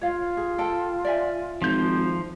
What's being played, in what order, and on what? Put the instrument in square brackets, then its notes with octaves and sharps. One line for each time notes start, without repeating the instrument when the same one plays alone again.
[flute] F4 [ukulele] C#5 F5
[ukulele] G#4
A4 G5 A5
D5 E5 G#5
[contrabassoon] G#1 [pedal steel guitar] F3 G6